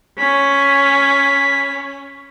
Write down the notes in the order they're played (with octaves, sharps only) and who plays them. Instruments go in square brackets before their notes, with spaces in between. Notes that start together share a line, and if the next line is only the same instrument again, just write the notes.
[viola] C#4 [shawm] B5